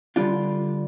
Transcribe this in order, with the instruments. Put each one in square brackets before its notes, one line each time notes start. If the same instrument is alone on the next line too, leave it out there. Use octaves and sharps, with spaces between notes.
[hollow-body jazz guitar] D3 G3 D4 F4